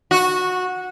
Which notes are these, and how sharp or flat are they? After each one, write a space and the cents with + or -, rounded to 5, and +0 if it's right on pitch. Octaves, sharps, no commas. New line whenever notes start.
F#4 -15